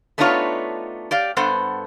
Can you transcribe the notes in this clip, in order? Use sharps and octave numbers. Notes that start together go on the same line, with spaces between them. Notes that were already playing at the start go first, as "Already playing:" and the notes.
A3 B3 D4 D#4 F4 C#5
G4 D5 F5
G2 B3 A4 C5 F#5